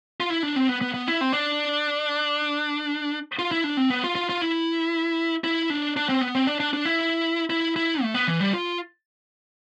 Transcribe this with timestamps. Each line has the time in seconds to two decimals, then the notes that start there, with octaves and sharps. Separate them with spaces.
0.20 F4
0.30 E4
0.43 D4
0.56 C4
0.69 B3
0.81 B3
0.94 B3
1.08 E4
1.21 C4
1.33 D4
3.39 F4
3.51 E4
3.64 D4
3.77 C4
3.90 B3
4.04 F4
4.15 F4
4.29 F4
4.41 E4
5.44 E4
5.70 D4
5.97 D4
6.09 C4
6.21 B3
6.35 C4
6.47 D4
6.60 D4
6.73 D4
6.85 E4
7.50 E4
7.76 E4
8.02 A3
8.14 B3
8.27 E3
8.41 G3
8.53 F4